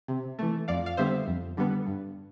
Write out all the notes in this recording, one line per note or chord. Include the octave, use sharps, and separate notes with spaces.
C3
E3 A3
F2 D5 F5
F5
D3 G3 B3 C5 E5
F2
D3 G3 B3
G2